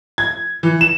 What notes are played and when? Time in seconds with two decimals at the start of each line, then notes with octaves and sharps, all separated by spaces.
0.18 G#6
0.63 E3
0.81 E7